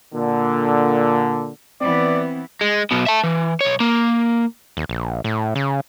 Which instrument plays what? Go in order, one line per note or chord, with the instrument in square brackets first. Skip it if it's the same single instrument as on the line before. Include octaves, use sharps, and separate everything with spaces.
[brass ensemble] A#2 D3
[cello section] E3 B3 E4 [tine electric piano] C4 [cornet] D5
[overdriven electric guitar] G#3
B1 B2
E5 A5
E3
B1 C#5
A#3
[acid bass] D#2
A#1
A2
C#3